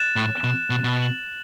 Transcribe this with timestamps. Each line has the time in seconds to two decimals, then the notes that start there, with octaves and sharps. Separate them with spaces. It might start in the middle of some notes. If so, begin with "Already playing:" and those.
Already playing: F#6 A6 E7
0.16 A2
0.44 B2
0.70 B2
0.84 B2
0.98 A6 F#7